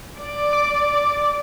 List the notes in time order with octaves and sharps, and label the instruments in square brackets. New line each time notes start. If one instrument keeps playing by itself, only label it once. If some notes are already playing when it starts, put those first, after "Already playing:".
[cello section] D5
[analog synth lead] D6